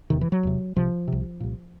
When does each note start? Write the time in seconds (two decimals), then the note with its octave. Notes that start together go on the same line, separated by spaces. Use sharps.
0.10 E1 E2 C3 D#3
0.21 E3
0.32 F#3
0.43 E1 E2 C3
0.76 C2 C3 F3
1.08 C2 C3
1.40 C2 A#2